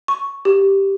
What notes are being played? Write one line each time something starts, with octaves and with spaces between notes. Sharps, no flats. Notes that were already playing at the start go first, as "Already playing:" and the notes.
C#6
G4